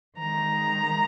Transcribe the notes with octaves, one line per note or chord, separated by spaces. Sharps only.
D#3 G#3 A#5